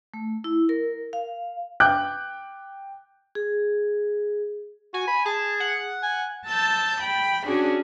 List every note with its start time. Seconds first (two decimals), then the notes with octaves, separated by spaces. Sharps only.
0.14 A3
0.44 E4
0.69 A#4
1.13 F5
1.80 G5 D6 F#6 G6
3.35 G#4
4.94 F#4 G#5
5.08 B5
5.26 G#4 A5
5.60 F#5
6.03 G#5
6.47 A5 E6 G6 A6
7.00 G5 B5
7.45 C#4 D4 F#4 G#4